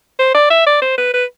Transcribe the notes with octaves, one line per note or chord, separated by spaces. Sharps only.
C5
D5
E5
D5
C5
B4
B4